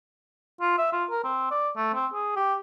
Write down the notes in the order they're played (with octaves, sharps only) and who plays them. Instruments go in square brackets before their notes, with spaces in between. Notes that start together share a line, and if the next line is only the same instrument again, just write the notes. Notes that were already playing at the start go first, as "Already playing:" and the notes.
[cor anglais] F4
E5
F4
A#4
C4
D5
A3
C4
G#4
G4